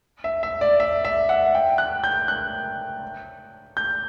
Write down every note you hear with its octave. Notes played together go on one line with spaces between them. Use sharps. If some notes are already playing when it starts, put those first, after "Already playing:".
E5
E5
D5
E5
E5
F#5
G5
F#6
G6
F#6
G6